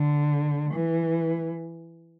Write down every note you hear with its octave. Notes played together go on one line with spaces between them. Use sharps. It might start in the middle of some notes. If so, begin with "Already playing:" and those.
Already playing: D3
E3